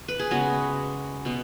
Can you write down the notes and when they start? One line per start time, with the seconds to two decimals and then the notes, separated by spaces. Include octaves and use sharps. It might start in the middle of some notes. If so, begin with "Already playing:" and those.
0.08 B4
0.19 G#4
0.31 C#3 G#3 B3 F#4
1.25 B2 B3